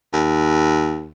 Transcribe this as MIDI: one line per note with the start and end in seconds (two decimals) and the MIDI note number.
0.13 1.11 39